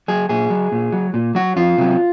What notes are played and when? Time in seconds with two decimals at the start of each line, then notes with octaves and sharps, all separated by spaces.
0.08 F#3 G#4
0.29 A#2 G#4
0.50 F#3
0.72 A#2
0.92 F#3
1.14 A#2
1.35 F#3 F#4
1.56 F2 F4
1.78 C3 F#3